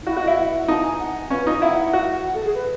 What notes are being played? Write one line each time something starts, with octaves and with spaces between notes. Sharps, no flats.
D#4
E4 F#4
F#4
D#5
E4
F#5
D#4 A5
G#5
F#5
C#4 B4
D#4 D#5
E4 F#5
F#4
F#5
A4
G#4
B4